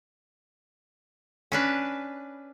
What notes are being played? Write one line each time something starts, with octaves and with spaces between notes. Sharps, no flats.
C#4 D4 B4